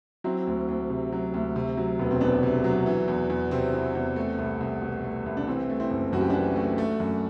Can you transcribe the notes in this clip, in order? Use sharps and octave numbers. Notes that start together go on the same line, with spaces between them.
F#3 C4 E4
D2
D2
C3
F#3
D2
C3
F#3
E1 B3
C4
E2 B3 D4
C3
F#3
E3
E2
E2
C3 C4
E3
E2
A3
C2
C2
B2
A3
C2
D4
E3 C4
A3
C4 E4
F#1
F#2 F#4
G4
E3 D4 F#4
A3
A3
F#2